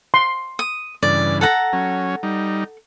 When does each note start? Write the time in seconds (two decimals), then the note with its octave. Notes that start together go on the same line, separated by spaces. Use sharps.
0.14 C6
0.59 D#6
1.03 G2 C#3 E3 D5
1.41 A4 F#5 A#5
1.73 F#3 C#4
2.23 G3 D#4